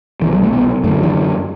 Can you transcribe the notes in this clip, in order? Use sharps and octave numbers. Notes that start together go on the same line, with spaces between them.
C2 B2 E3
F#3
A3
B3
F#2 D3 A3
E3